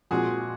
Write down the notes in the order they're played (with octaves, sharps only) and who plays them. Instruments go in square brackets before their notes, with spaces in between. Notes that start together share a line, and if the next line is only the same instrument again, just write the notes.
[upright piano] A#2 F3 G#3 C4 [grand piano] F#4 G#4